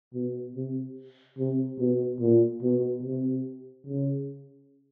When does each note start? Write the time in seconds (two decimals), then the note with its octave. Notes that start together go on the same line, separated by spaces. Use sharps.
0.14 B2
0.56 C3
1.38 C3
1.79 B2
2.20 A#2
2.62 B2
3.03 C3
3.86 C#3